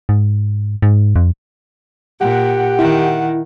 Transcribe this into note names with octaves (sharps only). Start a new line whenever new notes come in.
G#2
G#2
F2
A#2 G4 F#5
D#3 E4